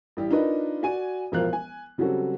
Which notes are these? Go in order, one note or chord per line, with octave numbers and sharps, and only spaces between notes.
A1 G3 G4
D4 D#4 F4 A#4 B4 D#5
F#4 D5 G#5 D#7
E1 A1 F3 A#4 F5 F#6
G#5
C#3 F#3 G3 C4 F#4 A4